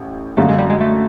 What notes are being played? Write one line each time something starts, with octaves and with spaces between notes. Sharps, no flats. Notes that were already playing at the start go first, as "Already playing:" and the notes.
Already playing: A1 A2
F#2 D3 F#3 A3 A#3
G#3
G3
G#3
A3